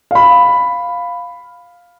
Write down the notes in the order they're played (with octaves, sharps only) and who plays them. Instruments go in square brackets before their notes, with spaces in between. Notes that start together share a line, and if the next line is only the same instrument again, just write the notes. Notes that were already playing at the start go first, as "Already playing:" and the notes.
[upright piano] F5 B5